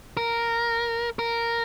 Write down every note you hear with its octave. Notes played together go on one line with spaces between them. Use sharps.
A#4
A#4